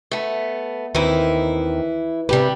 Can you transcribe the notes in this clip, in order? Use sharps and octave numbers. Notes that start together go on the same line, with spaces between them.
A3 B3
D#2 D#3 E3 C4 E4
C3 G3 D4 G4 B4